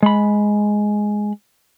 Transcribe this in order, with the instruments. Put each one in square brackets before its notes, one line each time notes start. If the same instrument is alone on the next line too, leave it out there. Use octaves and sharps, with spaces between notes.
[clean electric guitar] G#3 B5